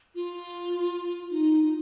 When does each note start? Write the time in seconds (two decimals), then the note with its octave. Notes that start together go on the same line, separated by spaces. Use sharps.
0.15 F4
1.31 D#4
1.64 D#4